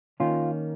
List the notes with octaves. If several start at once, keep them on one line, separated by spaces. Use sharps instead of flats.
D#3 A#3 C#4 F4